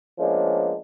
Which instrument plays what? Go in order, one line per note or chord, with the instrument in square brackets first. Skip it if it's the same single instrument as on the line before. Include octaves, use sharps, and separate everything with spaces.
[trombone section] F3 G#3 A#3 B3 C#4 D4